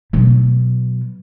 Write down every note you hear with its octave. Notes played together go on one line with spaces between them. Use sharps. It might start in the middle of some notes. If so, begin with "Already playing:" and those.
B2 F#3